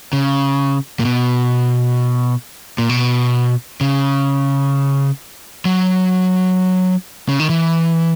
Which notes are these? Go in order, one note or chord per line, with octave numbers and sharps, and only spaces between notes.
C#3
A#2
B2
A#2
B2
C#3
F#3
C#3
D#3
E3